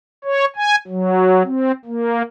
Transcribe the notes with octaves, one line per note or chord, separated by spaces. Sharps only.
C#5
G#5
F#3
C4
A#3